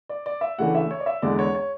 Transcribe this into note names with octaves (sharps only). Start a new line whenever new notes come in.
D5
D5
E5
D2 C#3 E3 A3 D4 F#5
E5
C#5
D5
E5
E2 D3 G#3 D4 D5
C#5
C#5